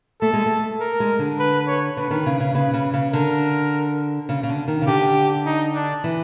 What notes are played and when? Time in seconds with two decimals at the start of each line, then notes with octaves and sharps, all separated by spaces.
0.21 A3 A4
0.34 G#3
0.46 A3
0.80 A#4
1.00 G#3
1.19 D3
1.39 B4
1.67 C#5
1.97 D3 B4
2.11 D#3
2.26 C#3
2.40 C#3
2.55 C#3 B4
2.74 C#3
2.94 C#3
3.13 D3 A#4
4.29 C#3
4.43 C#3
4.49 D3
4.68 D#3
4.81 C#3
4.87 D3 G4
5.46 D#4
5.74 D4
6.04 E3